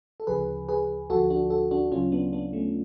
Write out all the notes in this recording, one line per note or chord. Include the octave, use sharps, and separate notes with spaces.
A4
D2 C#3 F3 G#4 B4
G#4 B4
D2 D3 F3 F#4 A4
D4 F#4
F#4 A4
D4 F#4
D2 C#3 F#3 C#4 F4
B3 D4
B3 D4
A3 C#4